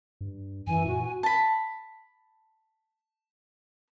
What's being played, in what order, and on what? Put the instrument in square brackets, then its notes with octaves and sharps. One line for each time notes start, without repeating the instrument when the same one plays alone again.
[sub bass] G2
[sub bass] F#2 [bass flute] E3 [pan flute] G#5
[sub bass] A#2 [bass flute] F#4
[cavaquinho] A5 B5